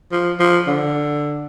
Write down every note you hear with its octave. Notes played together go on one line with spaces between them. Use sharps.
F3
F3
D3